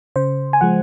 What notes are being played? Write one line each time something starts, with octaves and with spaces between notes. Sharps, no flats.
C#3 C5
G#5
F3 G#3 F#5